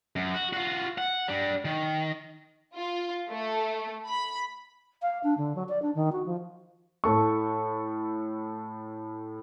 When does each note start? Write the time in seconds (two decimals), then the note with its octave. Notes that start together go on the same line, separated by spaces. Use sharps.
0.16 F#2
0.34 F#4
0.53 F4 F#4
0.98 F#5
1.28 G3 D4
1.65 D#3
2.74 F4
3.28 A3
4.08 B5
5.02 F5
5.24 D4
5.38 D3
5.56 F#3
5.69 D5
5.82 D4
5.95 D#3
6.12 F#4
6.26 F3
7.04 A2 A4 C#6